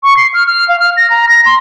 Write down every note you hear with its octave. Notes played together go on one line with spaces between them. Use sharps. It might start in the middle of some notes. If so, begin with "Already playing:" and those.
C#6
C7
F6
F6
F5
F6
A#6
A#5
A#6
C6